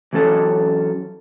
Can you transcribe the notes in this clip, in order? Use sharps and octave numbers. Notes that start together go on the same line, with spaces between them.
E3 F#3 C#4 A4 A5